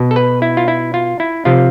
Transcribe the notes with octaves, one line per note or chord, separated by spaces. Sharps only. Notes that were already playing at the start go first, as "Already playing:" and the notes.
Already playing: B2
A4
B4
E4
F4
E4
F4
E4
C3 F3 F4